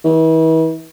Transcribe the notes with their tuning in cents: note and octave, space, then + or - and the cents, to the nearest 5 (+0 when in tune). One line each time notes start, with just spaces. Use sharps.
E3 -40